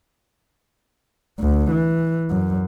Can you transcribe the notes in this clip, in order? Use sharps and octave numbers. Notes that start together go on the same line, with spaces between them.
D2
E3
F#2